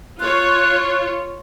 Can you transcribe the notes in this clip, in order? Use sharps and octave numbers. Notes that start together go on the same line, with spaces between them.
F4 C#5 F#6